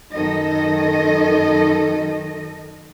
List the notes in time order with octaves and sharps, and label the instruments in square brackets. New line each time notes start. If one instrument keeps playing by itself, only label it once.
[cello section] F#2 D#3 A4 D#5